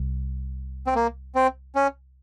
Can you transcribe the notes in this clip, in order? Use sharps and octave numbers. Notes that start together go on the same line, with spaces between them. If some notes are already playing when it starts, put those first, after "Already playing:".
Already playing: C2
C4
A#3
C4
C#4